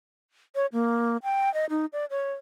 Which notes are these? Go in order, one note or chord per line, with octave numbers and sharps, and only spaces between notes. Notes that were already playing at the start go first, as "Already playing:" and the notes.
C#5
A#3
G5
D#5
D#4
D5
C#5